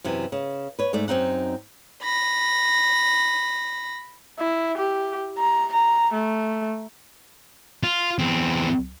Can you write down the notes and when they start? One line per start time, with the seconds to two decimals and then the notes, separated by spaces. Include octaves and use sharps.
0.04 F#2 C3 E3
0.32 C#3
0.79 B4 C#5
0.93 G#2 A3 D5
1.08 F#2 C4 D#4 F#5
2.03 B5 A#6
4.39 E4
4.78 G4
5.38 A#5
5.72 A#5
6.13 A3
7.83 F4
8.19 E2 C4